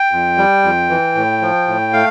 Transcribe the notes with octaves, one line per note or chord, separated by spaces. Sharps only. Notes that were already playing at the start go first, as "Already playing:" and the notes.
Already playing: G5
F2
G3
F2
E3
A2
F3
A2
A3 F5